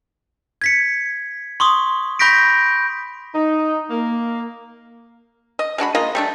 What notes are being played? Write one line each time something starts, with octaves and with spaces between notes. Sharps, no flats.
G#6 B6 C#7
C6 C#6 D#6
B5 C#6 G6 A#6 B6 D7
D#4
A#3
D#5
G#3 D4 F#4 B5
G#3 A#3 F4 D#5
G3 A3 D4